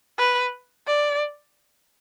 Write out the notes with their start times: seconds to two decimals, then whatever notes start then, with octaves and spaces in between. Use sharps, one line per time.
0.19 B4
0.87 D5